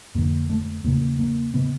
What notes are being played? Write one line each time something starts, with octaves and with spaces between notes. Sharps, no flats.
F2 D3 A#3
A3
E2 C#3 A#3
A#3
C#3 B3